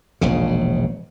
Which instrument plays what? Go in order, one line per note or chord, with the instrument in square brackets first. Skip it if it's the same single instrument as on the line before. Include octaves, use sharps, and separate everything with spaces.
[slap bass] E1 A#1 C#3